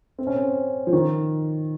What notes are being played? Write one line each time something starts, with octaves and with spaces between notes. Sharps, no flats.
C4
C#4
C4
F3
D#3